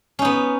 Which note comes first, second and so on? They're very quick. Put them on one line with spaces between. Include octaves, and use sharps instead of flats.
C#4 D#4 B3